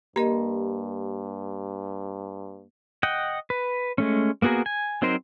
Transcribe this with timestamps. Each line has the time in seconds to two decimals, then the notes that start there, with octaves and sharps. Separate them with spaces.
0.16 G2 A#3 G4 A#4 D#5
3.03 D#5 F#5 G5
3.50 B4
3.98 G#3 A3 C#4
4.42 A#3 B3 F#4 G#4 A#4
4.66 G#5
5.02 F#3 C4 D#4 A#4 C5